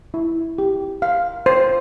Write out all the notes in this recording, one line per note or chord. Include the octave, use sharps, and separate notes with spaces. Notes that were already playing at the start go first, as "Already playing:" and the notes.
E4
G4
F5
C5